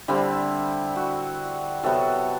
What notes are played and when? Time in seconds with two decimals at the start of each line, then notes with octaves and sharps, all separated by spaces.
0.08 D3 G3 C4 E4
0.96 F#4
1.83 C3 F#3 B3 F#4 A4